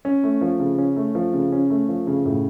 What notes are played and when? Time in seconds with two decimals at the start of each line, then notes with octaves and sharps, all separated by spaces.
0.05 C#4
0.24 A3
0.41 F3
0.60 C#3
0.78 C#4
0.96 A3
1.15 F3
1.33 C#3
1.52 C#4
1.70 A3
1.88 F3
2.07 C#3
2.25 A2